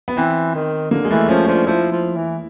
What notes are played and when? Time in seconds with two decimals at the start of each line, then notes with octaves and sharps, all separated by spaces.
0.08 B3
0.17 E3 C4
0.55 D#3
0.91 D3 A#3
1.05 G#3
1.10 E3 A3
1.29 F3 C#4
1.48 F3 D4
1.67 F3 E4
1.92 F3
2.16 E3